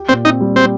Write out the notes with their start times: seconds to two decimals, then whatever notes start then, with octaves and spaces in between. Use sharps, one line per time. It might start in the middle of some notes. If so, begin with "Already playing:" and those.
Already playing: G4
0.09 A#2 C4
0.25 C4 D#4
0.41 G3
0.56 C4 G4